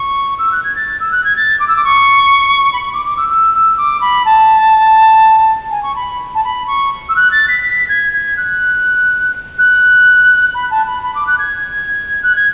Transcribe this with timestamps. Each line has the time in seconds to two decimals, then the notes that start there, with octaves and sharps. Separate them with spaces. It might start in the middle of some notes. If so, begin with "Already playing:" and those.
Already playing: C#6
0.39 E6
0.52 F#6
0.64 G#6
0.76 A6
1.00 E6
1.12 F#6
1.24 G#6
1.37 A6
1.60 D6
1.68 E6
1.76 D6
1.84 C#6
2.73 B5
2.81 C#6
2.93 D6
3.06 D6
3.17 E6
3.29 E6
3.54 E6
3.78 D6
4.01 B5
4.26 A5
5.71 G#5
5.83 C#6
5.96 B5
6.35 A5
6.44 B5
6.67 C#6
7.09 E6
7.16 F#6
7.32 A6
7.48 B6
7.64 B6
7.89 G#6
8.13 G#6
8.37 F#6
9.58 F#6
10.54 B5
10.71 A5
10.87 B5
11.03 B5
11.15 D6
11.27 F#6
11.39 G#6
12.23 F#6
12.36 G#6